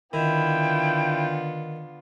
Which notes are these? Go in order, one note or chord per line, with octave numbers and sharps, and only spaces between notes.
D3 D#3 B3 E4 F4 G5